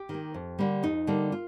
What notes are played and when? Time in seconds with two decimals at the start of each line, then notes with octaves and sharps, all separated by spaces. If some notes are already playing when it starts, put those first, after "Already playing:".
Already playing: G4
0.09 D#3 A#3
0.34 F2
0.59 D3 G3 A#3
0.83 F2 D#4
1.07 D3 G3 A#3
1.32 F4